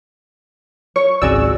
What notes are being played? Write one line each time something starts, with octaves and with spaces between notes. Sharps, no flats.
C#5 C#6
G#1 C#2 F#4 G#4 D5 E6